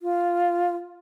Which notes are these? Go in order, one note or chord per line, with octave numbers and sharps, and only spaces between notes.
F4